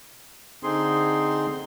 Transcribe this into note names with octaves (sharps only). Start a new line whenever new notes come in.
D3 C4 D#4 G#4 C6